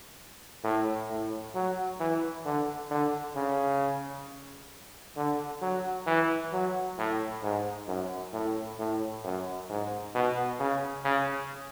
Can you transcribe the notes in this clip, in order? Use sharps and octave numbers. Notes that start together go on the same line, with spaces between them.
A2
A2
F#3
E3
D3
D3
C#3
D3
F#3
E3
F#3
A2
G#2
F#2
A2
A2
F#2
G#2
B2
C#3
C#3